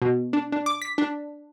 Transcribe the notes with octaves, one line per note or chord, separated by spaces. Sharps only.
B2
D4
D4
D6
B6
D4